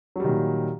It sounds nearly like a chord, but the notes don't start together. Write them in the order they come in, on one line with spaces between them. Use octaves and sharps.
F#3 G3 D#3 A#2